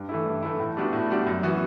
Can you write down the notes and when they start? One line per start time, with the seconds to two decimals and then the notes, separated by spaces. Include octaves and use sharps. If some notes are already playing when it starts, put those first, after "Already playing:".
Already playing: G2
0.09 E3 A3 E4
0.26 G2
0.43 E3 A3 E4
0.59 A2
0.77 G3 B3 D4 F#4
0.93 A2
1.10 G3 B3 D4 F#4
1.26 F#2
1.43 E3 B3 F#4